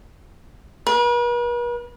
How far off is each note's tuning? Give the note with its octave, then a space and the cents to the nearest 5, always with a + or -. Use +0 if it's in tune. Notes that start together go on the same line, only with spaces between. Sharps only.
B4 -45